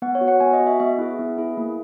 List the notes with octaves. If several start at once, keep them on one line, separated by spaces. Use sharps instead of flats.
B3 F#5
C#5
F#4
F#5
B3 G#5
D#5
F#4
E5
B3 E5
E4 G#4
B3
E4 G#4
A#3